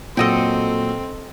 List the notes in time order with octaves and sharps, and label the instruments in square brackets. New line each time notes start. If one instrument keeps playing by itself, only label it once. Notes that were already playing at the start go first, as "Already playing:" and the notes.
[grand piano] A#2 F#3 D#7 [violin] C4 [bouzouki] A4 D#5 G5